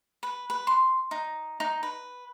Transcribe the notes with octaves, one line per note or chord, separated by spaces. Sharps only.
B4
B4
C6
D#4
D#4
B4